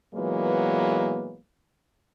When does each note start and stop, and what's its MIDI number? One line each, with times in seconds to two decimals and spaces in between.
0.14 1.37 46
0.14 1.37 52
0.14 1.37 54
0.14 1.37 56
0.14 1.37 58
0.14 1.37 59